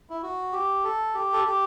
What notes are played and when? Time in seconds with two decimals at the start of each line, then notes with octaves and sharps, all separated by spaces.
0.10 E4
0.23 F#4
0.52 G4
0.84 A4
1.14 G4
1.33 A4
1.44 G4